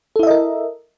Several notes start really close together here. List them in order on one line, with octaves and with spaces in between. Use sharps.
A4 E4 E5 D#5 A#4